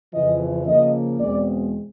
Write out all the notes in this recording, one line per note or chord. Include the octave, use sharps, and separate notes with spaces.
F2 C#3 E3 D#5
C#3 F3 A#3 D#5
E2 B2 G#3 C4 D5